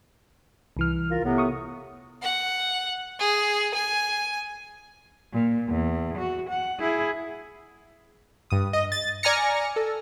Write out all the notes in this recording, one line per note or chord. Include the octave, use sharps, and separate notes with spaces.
C2 E3 F6
F4 A#4
A2 C3 B3
C#6 D#6
F#5
G#4
G#5
A#2
E2
F#4
F#5
E4 G#4
G2 D#6
D#5
A6
D5 G#5 A#5 F6 A#6 C#7
A4